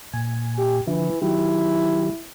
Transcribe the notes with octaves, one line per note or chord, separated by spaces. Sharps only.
A#2 G#5
G4
D3 E3 F3 E4
D#3 F#3 E4 G4